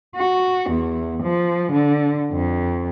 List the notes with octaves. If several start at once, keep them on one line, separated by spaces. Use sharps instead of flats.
F#4
E2
F3
D3
F2